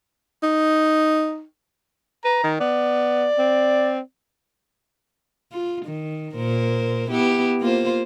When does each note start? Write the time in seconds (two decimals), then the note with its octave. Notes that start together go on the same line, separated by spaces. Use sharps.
0.43 D#4
2.25 B4 A#5
2.43 D#3
2.60 B3 D5
3.38 C4
5.52 F4
5.86 D#3
6.36 A#2 A#4 C5
7.11 B3 E4 G4
7.61 A#3 F4 C5